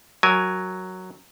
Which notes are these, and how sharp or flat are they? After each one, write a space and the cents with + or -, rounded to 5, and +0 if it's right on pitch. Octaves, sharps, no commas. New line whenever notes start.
F#3 +0 A#4 +0 G#5 +0